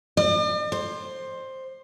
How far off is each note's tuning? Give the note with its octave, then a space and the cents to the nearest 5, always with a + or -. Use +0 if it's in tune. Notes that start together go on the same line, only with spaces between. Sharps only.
D5 +45
C5 +10